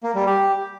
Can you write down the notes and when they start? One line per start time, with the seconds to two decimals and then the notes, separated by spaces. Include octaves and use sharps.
0.03 A#3
0.15 G3
0.27 G4